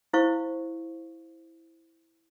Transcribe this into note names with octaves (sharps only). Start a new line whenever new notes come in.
E4 C5 F5 C#6